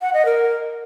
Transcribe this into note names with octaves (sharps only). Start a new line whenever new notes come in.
F#5
D#5
A#4